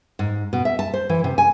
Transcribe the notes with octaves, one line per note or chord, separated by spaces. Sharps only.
G#2
B2
E5
A5
C5
E3
C3
G#5